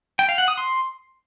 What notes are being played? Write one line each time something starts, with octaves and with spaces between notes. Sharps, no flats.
G5
F5
F#5
D#6
C6